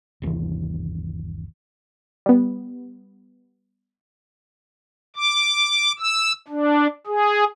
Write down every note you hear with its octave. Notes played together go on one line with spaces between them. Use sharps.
G1 D#2 C3 E3
G3 B3
D6
E6
D4
G#4